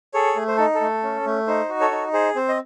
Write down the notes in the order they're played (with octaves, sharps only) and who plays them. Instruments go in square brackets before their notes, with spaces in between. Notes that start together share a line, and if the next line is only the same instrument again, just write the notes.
[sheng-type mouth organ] G#4 A4 C#5
A3
C5
D#4 A4
A4
A3
C#4
A3
D#4 C5
F#4
A4 C#5
D#4
G#4 C5
C4 C5
D#5